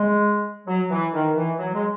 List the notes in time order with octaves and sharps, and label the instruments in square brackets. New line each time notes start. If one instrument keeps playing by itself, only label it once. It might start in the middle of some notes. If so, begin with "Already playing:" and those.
Already playing: [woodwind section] G#3
F#3
E3
D#3
E3
F#3
G#3